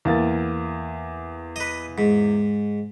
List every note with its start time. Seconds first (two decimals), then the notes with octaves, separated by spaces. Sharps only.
0.05 E2 A#3 A6
1.56 B4 D#5
1.98 G#2